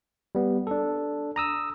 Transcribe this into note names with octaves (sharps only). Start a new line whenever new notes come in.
G3 B3
D4 A4
A#5 D#6 E6